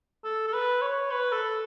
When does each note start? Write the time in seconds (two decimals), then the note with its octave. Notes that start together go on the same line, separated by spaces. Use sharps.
0.24 A4
0.47 A4
0.53 B4
0.81 C#5
1.11 B4
1.32 A4